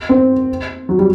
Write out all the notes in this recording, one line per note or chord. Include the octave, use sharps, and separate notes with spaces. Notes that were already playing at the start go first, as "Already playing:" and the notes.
C4
F#3
G3